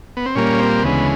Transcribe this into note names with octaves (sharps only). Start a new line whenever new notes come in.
B3
C4
A#2 G3 A#3 C#4
C4
D2 C#3 E3 G#3 B3